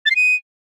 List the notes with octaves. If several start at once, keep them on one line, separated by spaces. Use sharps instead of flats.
A6
C7
D#7